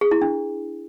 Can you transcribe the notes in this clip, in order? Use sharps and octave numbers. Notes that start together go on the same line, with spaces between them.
G#4
E4
D4